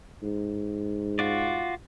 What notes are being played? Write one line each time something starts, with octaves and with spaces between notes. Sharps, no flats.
G#2
F4 F#4 D5